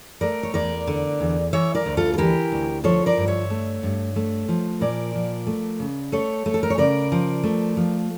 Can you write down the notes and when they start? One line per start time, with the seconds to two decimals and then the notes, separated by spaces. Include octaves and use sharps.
0.21 A3 A#4 D5
0.43 C#5
0.54 E2 A#4 D5
0.87 D3
1.21 E2
1.53 E3 C#5 E5
1.75 A#4 D5
1.86 D2
1.97 F4 A4
2.14 A4
2.18 E3 G4 A#4
2.52 D2
2.84 F3 A4 C#5
3.06 A#4 D5
3.17 G2
3.28 C#5 E5
3.50 A3
3.83 G2
4.16 A3
4.49 F3
4.81 A#2 A#4 D5
5.15 F3
5.47 A3
5.80 C#3
6.12 A3 A4 C#5
6.46 A3
6.54 A4
6.63 A#4
6.70 C#5
6.78 C#3 A#4 D5
7.12 F3
7.43 A3
7.77 F3